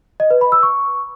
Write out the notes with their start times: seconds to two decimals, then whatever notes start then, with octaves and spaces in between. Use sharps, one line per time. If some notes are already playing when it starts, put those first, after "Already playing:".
0.20 D#5
0.31 B4
0.41 B5
0.52 E6
0.63 C#6